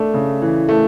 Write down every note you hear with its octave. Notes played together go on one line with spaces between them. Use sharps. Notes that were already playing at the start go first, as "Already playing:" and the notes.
Already playing: A3 D4
C#3
E3
A3